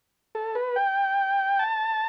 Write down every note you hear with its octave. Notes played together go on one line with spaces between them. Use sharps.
A4
B4
G5
A5